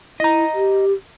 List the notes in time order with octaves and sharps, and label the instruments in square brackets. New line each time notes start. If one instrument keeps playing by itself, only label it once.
[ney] E4 [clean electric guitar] D#5 A#5
[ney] G4